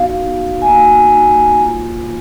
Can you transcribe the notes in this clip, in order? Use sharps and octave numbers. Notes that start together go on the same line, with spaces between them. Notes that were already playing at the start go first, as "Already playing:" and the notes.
Already playing: B3 D#4 F#4 F5
B3 D#4 F#4
G#5
A#3 D#4 F#4 A#5
A#3 D#4 F#4 A#5
A#3 F4